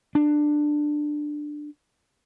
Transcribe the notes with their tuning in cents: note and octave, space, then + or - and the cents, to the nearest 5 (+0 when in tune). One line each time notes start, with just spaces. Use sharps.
D4 +15